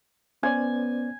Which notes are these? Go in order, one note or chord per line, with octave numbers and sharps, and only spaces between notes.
B3 C#4 C5 D5 G#5